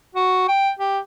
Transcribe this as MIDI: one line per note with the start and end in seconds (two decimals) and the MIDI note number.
0.15 0.48 66
0.48 0.70 79
0.79 0.99 67